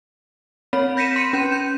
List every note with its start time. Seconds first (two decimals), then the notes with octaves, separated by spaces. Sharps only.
0.73 C4 C#5 B5
0.97 G6 A#6 B6 C#7 D#7 E7
1.16 C6 C#7 D#7
1.33 C#4 G6 E7
1.52 G6